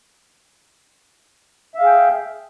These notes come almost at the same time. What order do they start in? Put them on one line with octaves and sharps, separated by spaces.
E5 F5 G#4 G5